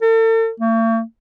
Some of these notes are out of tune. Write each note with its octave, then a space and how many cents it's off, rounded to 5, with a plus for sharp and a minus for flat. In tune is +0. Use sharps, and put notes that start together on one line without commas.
A4 +40
A3 +45